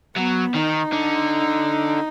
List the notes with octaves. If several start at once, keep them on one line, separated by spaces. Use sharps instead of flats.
F#3 B3
D#3 D#4
D3